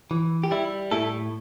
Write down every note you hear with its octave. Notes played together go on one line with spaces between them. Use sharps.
E3
G4
G3 E4
A2 E4 A4